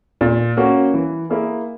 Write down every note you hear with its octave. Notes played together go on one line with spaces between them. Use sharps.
A#2
A#3 C#4 F#4
E3
A#3 E4 G#4